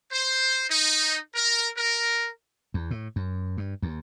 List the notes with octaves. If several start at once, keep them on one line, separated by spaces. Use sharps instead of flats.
C5
D#4
A#4
A#4
E2
A2
F#2
G2
D#2